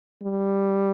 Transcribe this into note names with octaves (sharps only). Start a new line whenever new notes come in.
G3